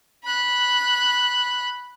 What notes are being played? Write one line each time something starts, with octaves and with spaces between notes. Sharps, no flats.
B5 F#6